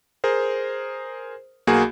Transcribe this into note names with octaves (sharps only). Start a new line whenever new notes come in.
G#4 A#4 C5
B1 A#3 F#4 G#4 G#5